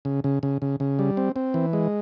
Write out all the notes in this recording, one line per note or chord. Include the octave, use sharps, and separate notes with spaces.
C#3
C#3
C#3
C#3
C#3
G3
C4
C4
E3
G#3